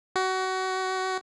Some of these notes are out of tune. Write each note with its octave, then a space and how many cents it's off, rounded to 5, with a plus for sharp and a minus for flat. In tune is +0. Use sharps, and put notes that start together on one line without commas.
F#4 +25